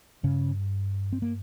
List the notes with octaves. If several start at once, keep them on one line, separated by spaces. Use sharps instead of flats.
G2 C#3 C#4
C4
A#3